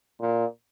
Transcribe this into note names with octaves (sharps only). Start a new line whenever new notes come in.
A#2